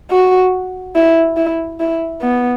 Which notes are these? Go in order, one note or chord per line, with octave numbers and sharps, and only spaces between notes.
F#4
E4
E4
E4
B3